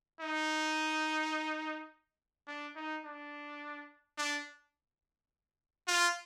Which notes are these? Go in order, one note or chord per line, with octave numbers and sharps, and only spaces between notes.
D#4
D4
D#4
D4
D4
F4